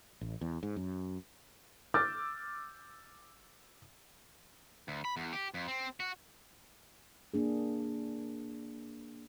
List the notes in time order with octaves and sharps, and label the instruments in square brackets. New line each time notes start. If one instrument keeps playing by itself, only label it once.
[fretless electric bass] A1
E2
G#2
F#2
[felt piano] D6 E6 F6 G6 A6
[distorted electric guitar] D2
B5
E2
G4
F2
C4
F#4
[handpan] A#3 D4 G#4